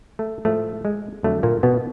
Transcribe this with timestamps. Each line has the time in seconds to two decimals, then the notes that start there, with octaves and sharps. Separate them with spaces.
0.19 A3
0.45 A2 F3 G#3 A3
0.85 G#3
1.23 F2 D3 F#3 A3
1.43 A#2 A#3
1.63 B2 B3